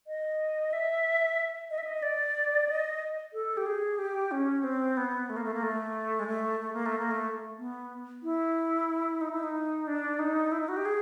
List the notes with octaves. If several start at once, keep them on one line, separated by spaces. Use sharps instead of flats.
D#5
E5
D#5
E5
D#5
D5
D#5
A4
G4
G#4
G4
C#4
C4
B3
A3
A#3
A3
A#3
A3
G#3
A3
A3
A#3
A3
A#3
A3
B3
E4
D#4
E4
D#4
D4
D#4
E4
D#4
F#4
G4
G#4